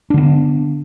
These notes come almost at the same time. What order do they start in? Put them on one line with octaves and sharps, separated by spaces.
D4 D3 B3